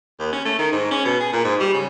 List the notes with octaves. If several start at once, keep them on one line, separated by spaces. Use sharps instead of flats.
D#2
C#4
A3
D#3
G#2
C#4
B2
G#4
A#2
G#2
G3
C#3